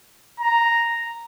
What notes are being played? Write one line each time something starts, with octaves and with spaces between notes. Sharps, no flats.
A#5